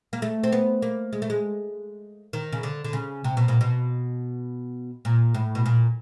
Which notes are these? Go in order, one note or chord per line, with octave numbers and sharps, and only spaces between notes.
A#3
A3
C4
B3
A#3
G#3
A3
G#3
D#3
C#3
D3
D3
C#3
C3
B2
A#2
B2
A#2
A2
B2
A#2